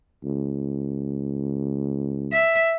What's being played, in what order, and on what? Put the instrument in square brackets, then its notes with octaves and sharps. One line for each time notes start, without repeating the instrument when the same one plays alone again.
[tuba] C#2
[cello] E5